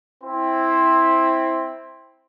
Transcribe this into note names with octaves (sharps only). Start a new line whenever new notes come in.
C4 E4 C5